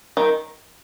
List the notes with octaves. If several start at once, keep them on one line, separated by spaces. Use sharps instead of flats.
D#3